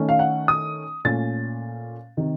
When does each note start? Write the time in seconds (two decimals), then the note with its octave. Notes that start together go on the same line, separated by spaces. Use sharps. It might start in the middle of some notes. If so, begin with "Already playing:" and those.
Already playing: D#3 A3 C#4
0.09 F5
0.19 F#5
0.48 D#6
1.05 A#2 A3 C#4 A6
2.17 C3 D#3